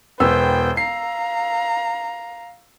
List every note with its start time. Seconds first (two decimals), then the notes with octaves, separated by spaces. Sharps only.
0.20 E1 B3 C5 G5 E6
0.77 F5 A#5 C7